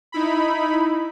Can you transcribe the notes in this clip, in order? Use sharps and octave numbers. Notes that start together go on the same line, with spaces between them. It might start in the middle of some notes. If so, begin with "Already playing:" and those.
D#4 E4 B5